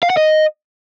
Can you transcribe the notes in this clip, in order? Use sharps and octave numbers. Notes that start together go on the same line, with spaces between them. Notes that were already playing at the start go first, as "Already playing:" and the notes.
F5
F#5
D#5